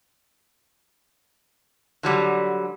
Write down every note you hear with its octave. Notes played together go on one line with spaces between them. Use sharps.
D3 F#3 G3